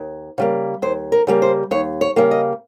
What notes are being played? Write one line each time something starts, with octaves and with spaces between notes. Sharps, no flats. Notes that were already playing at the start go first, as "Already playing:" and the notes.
Already playing: D#2
C#3 G3 A#3
D#2 C5
A#4
C#3 G3 A#3
C5
D#2 C#5
C#5
C#3 G3 A#3
D#5